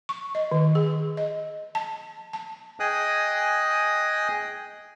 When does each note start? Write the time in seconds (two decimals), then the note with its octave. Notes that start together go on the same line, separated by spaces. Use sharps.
0.09 C#6
0.35 D#5
0.51 D#3
0.75 G#4
1.17 D#5
1.75 A5
2.33 A5
2.80 G#4 D#5 G5 G#5 D#6 F#6